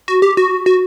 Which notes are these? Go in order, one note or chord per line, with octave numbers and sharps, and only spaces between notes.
F#4
G4
F#4
F#4